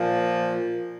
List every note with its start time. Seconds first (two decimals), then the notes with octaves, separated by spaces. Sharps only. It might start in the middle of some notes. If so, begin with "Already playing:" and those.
Already playing: A#2 F3